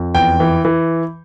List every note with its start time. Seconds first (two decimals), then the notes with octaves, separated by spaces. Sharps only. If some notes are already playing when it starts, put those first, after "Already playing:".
Already playing: F2
0.15 E2 G5
0.40 E3
0.65 E3